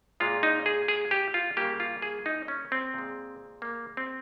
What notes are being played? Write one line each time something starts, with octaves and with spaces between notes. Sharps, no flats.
A#2 G#3 F4
D#4
G#4
G#4
G4
F4
C#3 G3 A#3 G4
F4
G#4
D#4
C#4
C4
A#2 G#3
A#3
C4